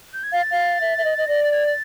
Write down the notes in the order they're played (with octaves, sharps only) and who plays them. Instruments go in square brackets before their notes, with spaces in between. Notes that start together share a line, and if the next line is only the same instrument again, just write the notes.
[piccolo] G6
G#6
[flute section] F5 [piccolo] A6
[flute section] F5
E5
E5
D#5
D#5
[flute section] D5 [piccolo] A#6
[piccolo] A6
G#6
A6